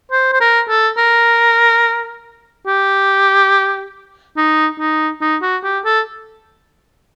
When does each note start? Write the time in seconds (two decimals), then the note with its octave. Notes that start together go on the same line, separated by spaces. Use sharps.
0.12 C5
0.33 C5
0.41 A#4
0.69 A4
0.98 A#4
2.67 G4
4.37 D#4
4.79 D#4
5.21 D#4
5.42 F#4
5.64 G4
5.85 A4